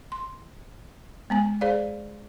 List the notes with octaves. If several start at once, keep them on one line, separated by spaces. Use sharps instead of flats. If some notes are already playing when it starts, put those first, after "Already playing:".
C6
G#3 B3 G#5
G#4 C5 D5 F5